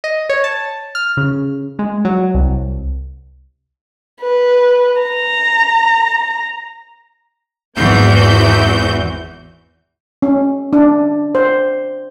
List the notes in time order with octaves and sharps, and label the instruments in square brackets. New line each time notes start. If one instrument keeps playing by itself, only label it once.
[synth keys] D#5
C#5
A5
F6
C#3
G#3
F#3
C2
[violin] B4
A#5
[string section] G#1 E2 E3 C4 F#4 G6
[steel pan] C#4
D4
C5